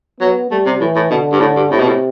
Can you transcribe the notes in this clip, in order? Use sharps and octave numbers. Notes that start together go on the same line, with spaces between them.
F#3 B3
G3 A3
C3
A2 E3
A2
B2 D3
G2
A2 D3
G2
A2 C3
B2
A2